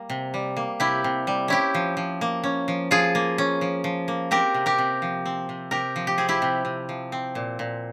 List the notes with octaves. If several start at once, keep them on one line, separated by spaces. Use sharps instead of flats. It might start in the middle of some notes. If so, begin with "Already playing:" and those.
Already playing: G3 A#3
C3
G3
A#3
C3 E4 G4
C3
G3
C#4 E4 G4
F3
F3
A#3
C#4
F3
F3 F4 G#4
A#3
C#4
F3
F3
A#3
C4 G4 A#4
C3
G4 A#4
C3
F3
C4
C3
C3 G4 A#4
F3
G4
C4 G#4
E4 G4
C3
C3
F3
C4
A#2
A#2